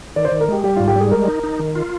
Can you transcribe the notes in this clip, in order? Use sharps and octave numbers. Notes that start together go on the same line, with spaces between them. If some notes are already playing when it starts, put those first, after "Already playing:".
D#3 D5
C5
D#3 D5
A#4
G#3 G4
G3 G4
G#2 F4
G4
G3 G#4
G#3 A#4
D#4
D#4
D#3
F4